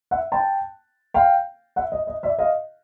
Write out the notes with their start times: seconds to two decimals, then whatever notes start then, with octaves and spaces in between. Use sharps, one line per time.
0.11 E5 F#5
0.32 G5 A5
1.14 F5 G5
1.76 E5 F#5
1.92 D#5
2.07 D#5
2.23 D5 E5
2.39 D#5 F5